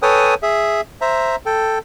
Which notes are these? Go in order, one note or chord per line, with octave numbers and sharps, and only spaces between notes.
A4 B4 C#5 G5 G#5 D#6
G#4 E5
C5 E5 A#5
A4 G5